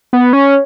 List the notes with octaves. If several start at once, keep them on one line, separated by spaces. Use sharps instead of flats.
B3
C#4